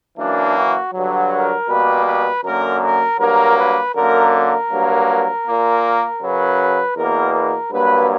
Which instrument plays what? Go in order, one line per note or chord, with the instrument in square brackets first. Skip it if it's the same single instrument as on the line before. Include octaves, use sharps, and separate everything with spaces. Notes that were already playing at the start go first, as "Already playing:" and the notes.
[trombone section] F#2 E3 A#3 D4
F#4
G2 D3 F#3
A#4
B2 G3 A#3 B4
B4
F#2 D3 A#3 A#4
A#4
G2 F#3 A#3 A#4
B4
F#2 D3 A#3 A#4
A#4
G2 F#3 A#3
A#2 A#3
F#2 C#3 F#3 B4
E2 B2 A#3 A#4
A#4
G2 F#3 A#3 B4